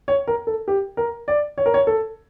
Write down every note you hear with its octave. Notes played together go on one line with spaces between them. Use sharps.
C#5
A#4
A4
G4
A#4
D5
C#5
A#4
C#5
A4